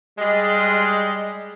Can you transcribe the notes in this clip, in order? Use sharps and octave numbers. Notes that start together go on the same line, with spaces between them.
G3 G#3